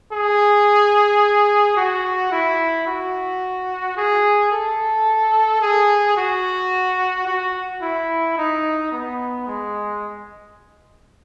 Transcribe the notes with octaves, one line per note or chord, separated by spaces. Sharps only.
G#4
F#4
E4
F#4
G#4
A4
G#4
F#4
F#4
E4
D#4
B3
G#3